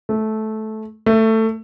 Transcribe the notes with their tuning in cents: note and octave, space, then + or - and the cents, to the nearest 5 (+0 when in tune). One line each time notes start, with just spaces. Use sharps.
A3 -15
A3 +15